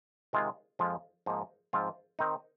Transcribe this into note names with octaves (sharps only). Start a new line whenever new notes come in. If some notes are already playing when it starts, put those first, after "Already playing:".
C3 D#3 G#3 F4
F2 F3 G#3 F4
G#2 F3 A#3 D#4
G#2 F3 C4 F4
D#3 C4 D#4